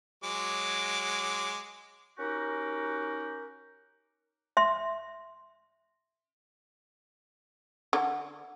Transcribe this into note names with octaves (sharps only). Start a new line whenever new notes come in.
F#3 G#3 D6
C#4 D#4 F#4 G4 A#4
E5 C6
D3